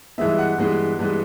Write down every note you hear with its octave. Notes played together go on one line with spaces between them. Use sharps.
G2 E3 G#3 B3 E5
F#5
G2 E3 G#3 B3
G2 E3 G#3 B3